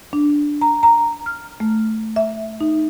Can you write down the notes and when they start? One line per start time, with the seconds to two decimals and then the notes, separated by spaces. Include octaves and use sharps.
0.13 D4
0.61 A#5
0.83 A#5
1.26 F6
1.60 A3
2.16 E5
2.60 D#4